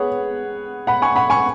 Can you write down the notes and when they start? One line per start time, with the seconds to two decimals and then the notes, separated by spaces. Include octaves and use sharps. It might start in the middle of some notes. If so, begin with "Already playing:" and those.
Already playing: B3 G#4 B4 C#5 F#5
0.87 F#5 B5
1.02 G#5 C#6
1.16 F#5 B5
1.30 G#5 C#6